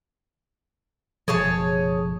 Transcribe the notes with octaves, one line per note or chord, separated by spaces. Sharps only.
F#1 B2 F3 G#4 C#5 A5